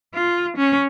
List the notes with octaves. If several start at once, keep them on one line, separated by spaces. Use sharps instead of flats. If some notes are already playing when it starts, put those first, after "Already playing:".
F4
C#4